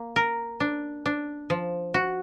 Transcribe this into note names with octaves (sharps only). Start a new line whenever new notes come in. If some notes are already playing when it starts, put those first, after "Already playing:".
Already playing: A#3
A#4
D4
D4
F3
F#4